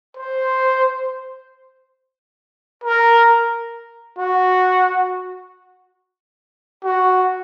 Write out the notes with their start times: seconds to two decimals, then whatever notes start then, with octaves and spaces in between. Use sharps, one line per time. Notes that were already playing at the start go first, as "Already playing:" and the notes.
0.17 C5
2.84 A#4
4.18 F#4
6.84 F#4